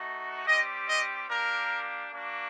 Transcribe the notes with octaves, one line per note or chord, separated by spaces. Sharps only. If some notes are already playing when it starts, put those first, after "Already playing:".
Already playing: A3 D#4 F#4
G3 C4 G4 D#5
D#5
A#3 D4 G4 A#4
A#3 D4 F#4